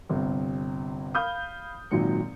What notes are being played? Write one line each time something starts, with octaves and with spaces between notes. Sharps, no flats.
G1 C3
F5 B5 D#6 F6 G6
G#1 A#2 D#3 F#3 C#7